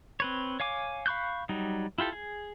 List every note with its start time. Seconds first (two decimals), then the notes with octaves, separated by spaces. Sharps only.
0.20 C4 B4 C#5
0.60 C#5 F5 G#5 D6
1.06 F5 B5 C#6 F#6 G6
1.49 F#3 G3 D#4
1.98 E4 F4 G4 A4
2.12 G#4